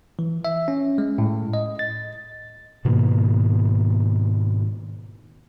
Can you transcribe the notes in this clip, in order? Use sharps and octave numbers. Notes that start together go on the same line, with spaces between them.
E3
E5
C#4
G#3
A2
D#5
A6
G#2 B2 D#3 A#3